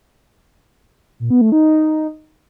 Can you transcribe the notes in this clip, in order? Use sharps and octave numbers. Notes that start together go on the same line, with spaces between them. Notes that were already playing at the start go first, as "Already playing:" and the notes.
A#2
B3
A3
D#4